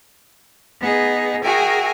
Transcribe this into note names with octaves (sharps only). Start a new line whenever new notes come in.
B3 D#4 G#4
F#4 G#4 A#4 E5 G5 G#5